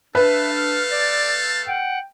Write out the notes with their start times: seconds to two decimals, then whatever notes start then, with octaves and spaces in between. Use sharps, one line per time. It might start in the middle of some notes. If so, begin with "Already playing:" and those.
0.15 A3 D4 A4 B4 E5 F5
0.57 F6
0.91 D5 A6
1.67 F#5 G5